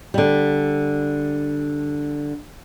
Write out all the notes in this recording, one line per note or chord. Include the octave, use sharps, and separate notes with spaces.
D3 G3